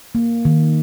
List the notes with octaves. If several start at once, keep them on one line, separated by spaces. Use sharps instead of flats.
A#3
D#3